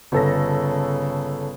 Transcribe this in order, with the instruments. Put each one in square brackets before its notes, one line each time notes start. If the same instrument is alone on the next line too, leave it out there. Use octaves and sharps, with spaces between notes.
[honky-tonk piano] G1 A4 A#6 [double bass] C#3